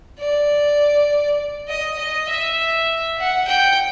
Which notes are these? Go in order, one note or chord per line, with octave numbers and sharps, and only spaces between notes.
D5
D#5
D#5
E5
F#5
G5